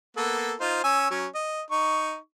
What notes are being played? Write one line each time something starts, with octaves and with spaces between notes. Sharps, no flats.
A#3 B3 A4
D#4 F4 C5
C#4 G#5 E6
F#3 C#4
D#5
D#4 C#6